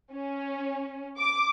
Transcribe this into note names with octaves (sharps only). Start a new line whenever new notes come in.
C#4
D6